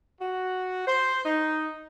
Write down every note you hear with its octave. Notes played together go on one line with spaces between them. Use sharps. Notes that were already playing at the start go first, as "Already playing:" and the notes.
F#4
C5
D#4